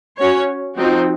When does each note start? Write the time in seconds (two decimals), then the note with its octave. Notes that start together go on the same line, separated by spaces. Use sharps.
0.18 C#4 F#4 C#5
0.76 F3 C4 D#4 F#4